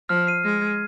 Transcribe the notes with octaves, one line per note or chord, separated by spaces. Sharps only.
F3 F6
C7 D#7
G#3 F6
G#6
D#7